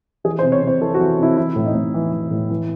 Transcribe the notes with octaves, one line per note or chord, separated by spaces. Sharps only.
E3 G#4
C5
C3
C#5
C3
C5
E3 A4
F#4
E3
C3 E4
E3 E4
A2
D#4
A2
E3
E3
A2
E3